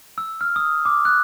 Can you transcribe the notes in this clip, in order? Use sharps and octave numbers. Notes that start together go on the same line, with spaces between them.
E6
F6
D#6
D6
F#6